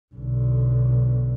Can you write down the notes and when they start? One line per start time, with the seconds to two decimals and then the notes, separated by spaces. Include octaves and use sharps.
0.15 B1 D3